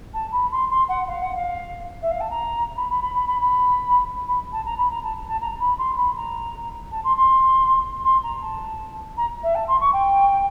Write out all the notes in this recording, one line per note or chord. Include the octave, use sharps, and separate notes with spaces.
A5
B5
C6
C6
F#5
F5
F#5
F5
E5
F5
A5
A#5
B5
B5
B5
B5
B5
B5
B5
A5
A#5
B5
A#5
A5
A5
A#5
B5
C6
B5
A#5
A5
C6
C6
C6
A#5
A5
A#5
E5
A5
C6
C#6
G5